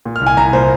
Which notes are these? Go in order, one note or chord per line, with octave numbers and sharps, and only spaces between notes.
A#2
F6
C2
G#5
C2 A#5
A#2 C5